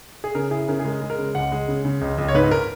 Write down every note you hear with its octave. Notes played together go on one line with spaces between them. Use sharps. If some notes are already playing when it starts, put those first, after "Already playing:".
G#4
C#3 A#4
E4 G#4
C#3 A#4
G#4
G#3 A#4
G#3
A#4
C#3
C#2 F#5
G#3
C#3
C#3
C#2
C#2
C#5
G#2 B4
A#4